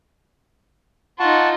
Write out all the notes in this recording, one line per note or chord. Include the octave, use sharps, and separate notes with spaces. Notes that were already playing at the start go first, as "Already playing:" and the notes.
D#4 F4 F#5 A5 C#6